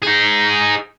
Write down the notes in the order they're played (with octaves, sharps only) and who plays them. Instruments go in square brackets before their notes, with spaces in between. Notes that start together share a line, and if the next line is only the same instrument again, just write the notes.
[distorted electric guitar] D#4 G#4